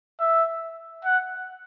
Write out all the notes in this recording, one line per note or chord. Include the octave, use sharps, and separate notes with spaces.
E5
F#5